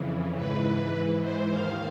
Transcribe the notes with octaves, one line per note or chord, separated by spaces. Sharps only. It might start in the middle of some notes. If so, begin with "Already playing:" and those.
Already playing: F2 C#3 E3
G#2 E3 B4
G#2 E3
C5
D#2 D#3 F5